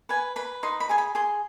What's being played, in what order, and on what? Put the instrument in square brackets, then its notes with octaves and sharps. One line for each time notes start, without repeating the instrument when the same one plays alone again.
[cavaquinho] B4 G#5
B4 B5
D#4 C6
B5
G#4 G#5
B5
G#4 C6